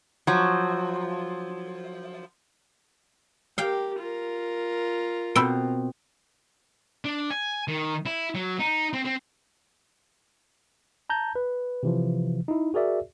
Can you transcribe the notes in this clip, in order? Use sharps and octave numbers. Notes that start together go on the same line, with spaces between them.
F3 F#3
G4 A#4 F5 G5
F4 A#4
B2 C4 B5 E6 D7
D4
G#5
D#3
E4
F#3
D#4
C4
C4
A5 A#5 G6
B4
C3 E3 F3
D#4 E4
F#4 G#4 A#4 D5 E5